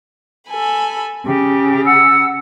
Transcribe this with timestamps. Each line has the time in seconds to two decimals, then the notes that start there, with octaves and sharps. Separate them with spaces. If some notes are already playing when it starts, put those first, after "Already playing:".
0.49 A4 G#5 B5
1.26 C#3 G4
1.85 F#5 E6